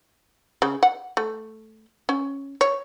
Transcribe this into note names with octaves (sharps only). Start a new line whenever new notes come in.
C#3
F#5
A3
C#4
C#5